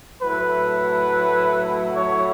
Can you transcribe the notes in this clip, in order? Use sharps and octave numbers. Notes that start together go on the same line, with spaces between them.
A2 F#3 A3 E4 B4
C#5